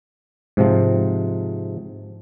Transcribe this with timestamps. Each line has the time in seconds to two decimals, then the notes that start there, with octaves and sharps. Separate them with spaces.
0.57 G#2 C3 F3